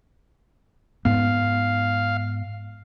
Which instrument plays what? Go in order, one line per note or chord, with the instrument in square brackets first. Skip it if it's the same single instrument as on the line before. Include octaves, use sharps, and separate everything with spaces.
[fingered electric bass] G#2 B3 [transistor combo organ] F5